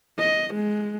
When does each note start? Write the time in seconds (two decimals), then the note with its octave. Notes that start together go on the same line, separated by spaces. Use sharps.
0.19 D#5
0.54 G#3